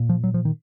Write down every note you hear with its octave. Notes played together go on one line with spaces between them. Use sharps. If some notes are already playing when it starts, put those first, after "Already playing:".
Already playing: A#2
F3
F#3
F3
D#3